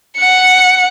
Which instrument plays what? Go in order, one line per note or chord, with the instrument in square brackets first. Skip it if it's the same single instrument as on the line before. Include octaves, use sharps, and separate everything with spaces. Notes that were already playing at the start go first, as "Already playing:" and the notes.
[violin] F#5 C#7